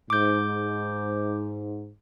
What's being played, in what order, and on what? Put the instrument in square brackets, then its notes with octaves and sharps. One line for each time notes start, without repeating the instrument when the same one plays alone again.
[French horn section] G#2 [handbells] D6 G6